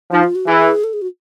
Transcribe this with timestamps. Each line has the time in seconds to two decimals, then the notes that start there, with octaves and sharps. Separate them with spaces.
0.11 F3 D#4
0.24 F4
0.35 F#4
0.47 E3 G#4
0.84 A4
0.93 G#4
1.02 F#4